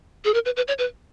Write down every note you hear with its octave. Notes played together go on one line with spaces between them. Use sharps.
G#4
A#4
B4
B4
C#5
B4